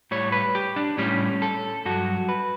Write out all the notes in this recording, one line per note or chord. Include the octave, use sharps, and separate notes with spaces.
A2 G3 C#5
B4
G4
D4
A2 G3 C#4
A4
G2 F#3 F#4
B4